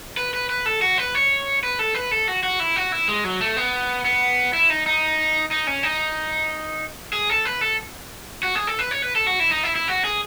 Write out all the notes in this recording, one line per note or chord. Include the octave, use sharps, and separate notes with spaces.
B4
B4
B4
A4
F#4
B4
C#5
B4
A4
B4
A4
F#4
F#4
E4
F#4
E4
G#3
F#3
A3
B3
B3
E4
D#4
D#4
D#4
C#4
D#4
G#4
A4
B4
A4
F#4
G#4
A4
B4
C#5
B4
A4
F#4
E4
D#4
E4
E4
F#4
G#4